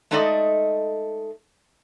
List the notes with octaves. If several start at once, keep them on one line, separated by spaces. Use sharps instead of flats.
G#3 A3 D#4 A4 D5 D#5